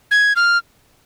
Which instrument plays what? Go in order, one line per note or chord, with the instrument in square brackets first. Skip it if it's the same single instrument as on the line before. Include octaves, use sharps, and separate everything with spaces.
[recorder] G#6
F6